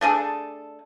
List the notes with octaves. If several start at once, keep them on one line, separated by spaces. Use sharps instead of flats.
A3 D4 G#4 A4